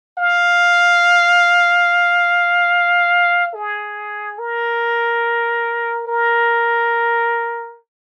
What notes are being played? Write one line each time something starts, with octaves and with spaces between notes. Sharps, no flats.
F5
G#4
A#4
A#4